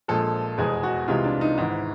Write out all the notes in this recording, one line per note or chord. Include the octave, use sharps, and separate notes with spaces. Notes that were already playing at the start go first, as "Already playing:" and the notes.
A#1 A#2 F3 G#3 A4
F1 E2 B2 G#3 G#4
F#4
C2 C3 E3 G#3 F4
D4
D#4
G#1 G#2 E3